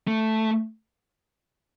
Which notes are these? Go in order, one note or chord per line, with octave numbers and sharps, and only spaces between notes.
A3